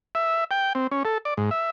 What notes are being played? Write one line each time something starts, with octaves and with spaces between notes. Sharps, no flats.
E5
G5
C4
C#4
A4
D5
G#2
E5